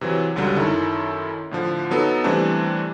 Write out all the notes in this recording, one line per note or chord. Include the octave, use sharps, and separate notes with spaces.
C3 E3 F#3
G1 C#2 D3 F#3 G3 D4
F#2 D#3 E4 A4
A2 D3 F3
F#3 B3 D#4 A4
C3 E3 G3 A3 C4 D4